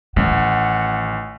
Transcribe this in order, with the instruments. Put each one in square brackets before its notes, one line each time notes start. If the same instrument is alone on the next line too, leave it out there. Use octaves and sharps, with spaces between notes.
[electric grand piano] A1 [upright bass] D#3 [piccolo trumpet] F#5